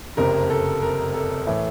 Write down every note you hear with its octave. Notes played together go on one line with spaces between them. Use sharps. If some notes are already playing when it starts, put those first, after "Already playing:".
F#1 F2 C3 A#4
A4
A#4
A4
A2 E3